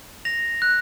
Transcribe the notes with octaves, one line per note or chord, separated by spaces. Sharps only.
A#6 F7
F#6